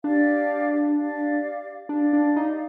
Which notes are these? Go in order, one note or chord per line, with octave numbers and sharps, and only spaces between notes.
D4 G4 D5 F5
G4 D5 F5
D4 G4 D5 F5
D4
D#4